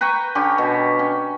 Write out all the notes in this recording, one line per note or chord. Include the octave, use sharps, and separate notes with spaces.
B4 G5 A#5 C#6
D3 C#4 G4
B2
C#4